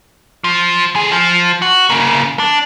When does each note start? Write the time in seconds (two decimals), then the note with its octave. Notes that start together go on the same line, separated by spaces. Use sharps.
0.44 F3
0.95 A3 G#4
1.12 F3
1.62 F#4
1.90 C#3 A#3
2.39 D4